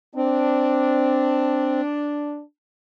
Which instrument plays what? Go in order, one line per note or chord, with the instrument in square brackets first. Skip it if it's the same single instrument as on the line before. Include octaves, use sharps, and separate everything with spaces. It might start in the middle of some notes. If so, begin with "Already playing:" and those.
[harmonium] C4 [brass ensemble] D4